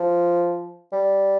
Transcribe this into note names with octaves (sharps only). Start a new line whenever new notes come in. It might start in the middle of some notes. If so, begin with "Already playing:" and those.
Already playing: F3
G3